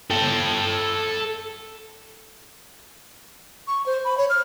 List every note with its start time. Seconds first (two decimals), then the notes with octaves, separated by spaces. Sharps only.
0.11 A4 G5
3.68 C#6
3.86 C5
4.05 B5
4.18 C#5
4.30 F6